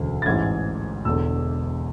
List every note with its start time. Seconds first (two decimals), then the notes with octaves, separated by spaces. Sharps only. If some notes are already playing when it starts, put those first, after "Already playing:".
Already playing: E1 D2 C#3 E3
0.22 A6
0.26 A1 G#2 E3 G#6
1.05 E1 E2 D3 E6